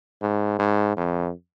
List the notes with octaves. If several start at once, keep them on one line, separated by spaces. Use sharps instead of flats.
G#2
G#2
F2